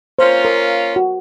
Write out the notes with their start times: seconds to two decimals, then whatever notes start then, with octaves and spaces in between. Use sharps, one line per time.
0.19 A#3 C#4 F4 C5
0.45 A#4
0.96 F#4